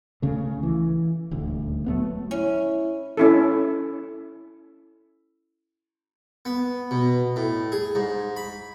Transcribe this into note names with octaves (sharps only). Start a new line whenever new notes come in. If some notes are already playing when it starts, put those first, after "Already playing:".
C#2 C#3 A3
E3
D#1 D2
F#3 A3 B3
C#4 E4
C#4 E4 A4
B3
B2
A2
G#4
G#2
B5